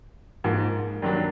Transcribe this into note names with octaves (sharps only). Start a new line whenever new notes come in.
G#2 F3 A#3
G2 D#3 F#3 A#3 D4